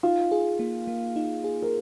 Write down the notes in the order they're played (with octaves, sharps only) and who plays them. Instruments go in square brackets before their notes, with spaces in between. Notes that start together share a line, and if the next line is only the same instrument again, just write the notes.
[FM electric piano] D#4 [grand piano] F4
[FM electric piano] G#4
A#3
A#3
D#4
G#4
[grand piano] A#4